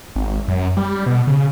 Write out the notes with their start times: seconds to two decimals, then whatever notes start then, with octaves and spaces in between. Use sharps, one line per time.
0.16 G#1
0.48 F#2
0.77 G3
1.06 B2
1.27 C#3